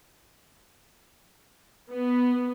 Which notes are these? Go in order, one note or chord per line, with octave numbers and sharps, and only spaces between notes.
B3